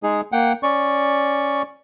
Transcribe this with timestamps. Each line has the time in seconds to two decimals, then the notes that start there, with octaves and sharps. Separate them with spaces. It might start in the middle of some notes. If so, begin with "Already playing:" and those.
0.03 G#3 D#4 G#4
0.32 A#3 F#5 G5
0.63 C#4 D5 C#6